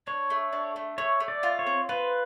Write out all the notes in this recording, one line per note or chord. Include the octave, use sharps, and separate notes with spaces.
D4 C#5
A3
D4
A3
A3 C#5
A3
D5
F4
C#5
C4
F4 B4